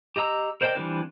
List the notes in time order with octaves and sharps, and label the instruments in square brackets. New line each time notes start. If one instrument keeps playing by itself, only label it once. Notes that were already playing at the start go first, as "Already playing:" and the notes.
[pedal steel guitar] G4 D#5 A#5 E6
A#4 C5 D5 D#5 G5
E3 G3 C4 D4 F4